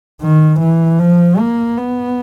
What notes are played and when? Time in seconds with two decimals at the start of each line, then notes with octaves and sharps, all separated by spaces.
0.21 D#3
0.60 E3
0.99 F3
1.38 A#3
1.77 B3